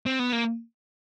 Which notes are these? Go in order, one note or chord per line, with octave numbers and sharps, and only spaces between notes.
C4
B3
A#3